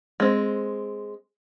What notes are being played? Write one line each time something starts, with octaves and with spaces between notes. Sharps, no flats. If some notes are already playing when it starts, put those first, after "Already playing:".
G#3 C4